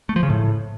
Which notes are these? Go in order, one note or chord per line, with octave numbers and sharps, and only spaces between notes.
A3
F3
C#3
A2